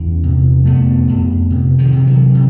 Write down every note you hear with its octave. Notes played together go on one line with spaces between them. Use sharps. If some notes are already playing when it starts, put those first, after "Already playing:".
Already playing: E2 B3 C#4
C3
F2 A3 B3
F2
C3
D#3 F3
C3
E3 F#3
C3